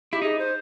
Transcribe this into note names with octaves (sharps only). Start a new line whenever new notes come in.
E4 G4
D#4 G#4
C5